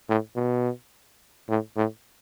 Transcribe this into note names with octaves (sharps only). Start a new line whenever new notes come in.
A2
B2
A2
A2